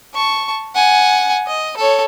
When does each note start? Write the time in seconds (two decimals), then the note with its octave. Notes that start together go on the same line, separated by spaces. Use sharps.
0.14 A5 C#6
0.74 F#5 G#5
1.47 D#5
1.77 A4 C#5